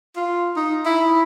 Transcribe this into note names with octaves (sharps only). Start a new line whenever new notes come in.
F4
D#4
E4